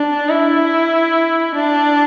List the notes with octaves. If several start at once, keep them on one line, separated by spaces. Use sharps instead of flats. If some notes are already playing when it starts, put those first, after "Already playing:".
Already playing: D4
E4
D4